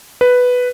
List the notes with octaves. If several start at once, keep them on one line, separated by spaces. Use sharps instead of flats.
B4